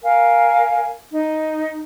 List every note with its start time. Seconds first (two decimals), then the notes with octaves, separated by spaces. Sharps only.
0.03 A#4 F5 G#5
1.12 D#4